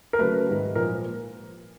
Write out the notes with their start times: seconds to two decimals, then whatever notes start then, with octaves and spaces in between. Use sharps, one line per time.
0.13 A#4
0.19 C#3 F#3 A3 B4
0.47 G#2 D#3 G3
0.75 A#2 F3 A#3 A#4